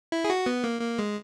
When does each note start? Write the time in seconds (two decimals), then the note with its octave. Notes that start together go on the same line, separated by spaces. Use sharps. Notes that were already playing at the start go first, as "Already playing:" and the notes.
0.12 E4
0.24 G#4
0.30 F#4
0.46 B3
0.64 A#3
0.81 A#3
0.99 G#3